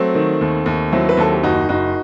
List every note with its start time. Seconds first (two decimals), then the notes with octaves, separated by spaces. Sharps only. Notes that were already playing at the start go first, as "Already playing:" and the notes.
Already playing: F#3 A3 C4
0.15 D#3
0.41 D#2
0.66 D#2
0.92 F#3 C4 E4
1.09 B4
1.17 D#2 A4
1.33 G4
1.43 F#1 D#4 F#4
1.69 F#1 D#4 F#4